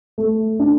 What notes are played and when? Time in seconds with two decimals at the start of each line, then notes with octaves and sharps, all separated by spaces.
0.18 A3
0.60 D4